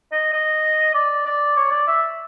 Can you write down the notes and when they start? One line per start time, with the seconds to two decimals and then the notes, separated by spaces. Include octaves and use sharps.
0.12 D#5
0.33 D#5
0.94 D5
1.26 D5
1.57 C#5
1.71 D5
1.87 E5